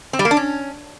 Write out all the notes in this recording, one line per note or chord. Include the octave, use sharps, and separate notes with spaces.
C4
G3
A#3
D4
C#4